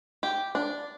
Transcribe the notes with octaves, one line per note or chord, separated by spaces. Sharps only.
G4
D4